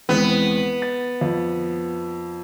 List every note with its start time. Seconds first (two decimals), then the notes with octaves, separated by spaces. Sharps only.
0.09 E2 G#3 B3 C4
0.82 A6
1.21 F2